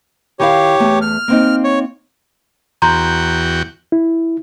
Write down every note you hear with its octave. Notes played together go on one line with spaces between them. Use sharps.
D#3 E4 G4 C#5 F5
E2 A3
F6
A#3 C4 D#4
C#5
E2 F#4 G5 A#5 C6 G6
E4